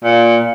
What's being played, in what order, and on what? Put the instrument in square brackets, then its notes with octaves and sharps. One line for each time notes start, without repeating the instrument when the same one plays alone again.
[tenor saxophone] A#2